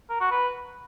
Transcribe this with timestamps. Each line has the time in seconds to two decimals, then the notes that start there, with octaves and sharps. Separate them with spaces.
0.10 A#4
0.20 F#4
0.31 B4